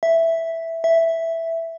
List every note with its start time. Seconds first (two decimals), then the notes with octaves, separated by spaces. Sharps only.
0.03 E5
0.84 E5